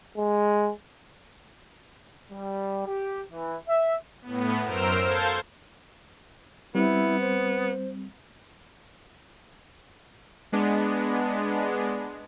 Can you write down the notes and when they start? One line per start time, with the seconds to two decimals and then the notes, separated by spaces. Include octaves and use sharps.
0.17 G#3
2.31 G3
2.87 G4
3.33 E3
3.68 E5
4.22 A2 B3
4.63 F#2 A#4 C5 E6 F6 D7
5.04 A4 C5 F5 G6 G#6
6.75 G3 B3 C4 E4
7.20 C5
10.52 G#3 B3 D4